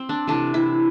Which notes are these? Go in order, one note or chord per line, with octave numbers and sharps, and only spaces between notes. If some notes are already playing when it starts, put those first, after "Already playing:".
Already playing: C4
D4
C3 E3 A3 D4
E4